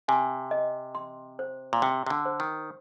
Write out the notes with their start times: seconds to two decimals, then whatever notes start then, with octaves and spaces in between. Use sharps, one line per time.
0.08 C3 G#5
0.51 D#5
0.95 C6
1.39 C5
1.73 A#2
1.82 C3 G5
2.06 C3
2.10 D3
2.25 C5
2.40 D#3